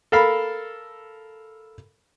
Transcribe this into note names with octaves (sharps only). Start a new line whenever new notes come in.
A4 A#4 F5 B5